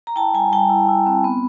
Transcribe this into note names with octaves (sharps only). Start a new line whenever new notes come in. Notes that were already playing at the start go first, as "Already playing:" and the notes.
A#5
E4 G5 A5
G3 G#5 A#5
G3 G5 A5
E4
E4
C4
B3